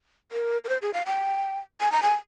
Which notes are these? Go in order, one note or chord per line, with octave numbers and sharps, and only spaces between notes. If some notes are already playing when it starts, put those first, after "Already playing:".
A#4
A#4
C5
G#4
F5
G5
G#5
A#5
G#5